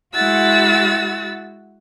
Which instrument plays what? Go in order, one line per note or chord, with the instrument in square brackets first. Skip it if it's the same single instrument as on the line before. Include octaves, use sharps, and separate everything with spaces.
[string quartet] G#3 E4 F#4 F#5 E6 A6